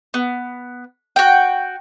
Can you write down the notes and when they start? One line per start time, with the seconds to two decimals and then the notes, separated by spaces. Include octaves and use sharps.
0.14 B3
1.16 F#4 G5